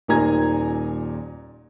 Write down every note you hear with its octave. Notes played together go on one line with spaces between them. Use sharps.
D#1 A#2 D#3 G#5 A#5 G#6